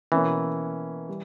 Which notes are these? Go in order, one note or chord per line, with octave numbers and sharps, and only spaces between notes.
B2 E3 A#3 C#4
G3